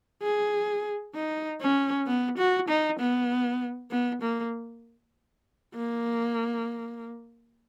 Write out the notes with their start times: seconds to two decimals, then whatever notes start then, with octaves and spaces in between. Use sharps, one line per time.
0.23 G#4
1.15 D#4
1.61 C#4
2.07 B3
2.38 F#4
2.69 D#4
2.99 B3
3.91 B3
4.22 A#3
5.75 A#3